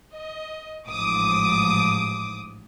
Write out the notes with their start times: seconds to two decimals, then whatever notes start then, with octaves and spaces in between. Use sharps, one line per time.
0.12 D#5
0.87 A1 G#2 F3 D6 D#6